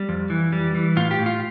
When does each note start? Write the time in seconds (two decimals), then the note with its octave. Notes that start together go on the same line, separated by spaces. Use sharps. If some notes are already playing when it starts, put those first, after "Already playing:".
Already playing: G3
0.09 F2
0.30 E3
0.52 G3
0.75 E3
0.96 A2 F4
1.11 G4
1.19 A2
1.26 F4